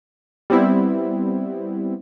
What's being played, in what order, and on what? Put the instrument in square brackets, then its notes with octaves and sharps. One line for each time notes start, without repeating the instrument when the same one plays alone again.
[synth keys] G3 B3 C4 E4